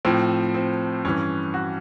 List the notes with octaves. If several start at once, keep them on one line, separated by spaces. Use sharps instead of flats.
A2 F3 C4
C4
G2 E3 C#4
F#4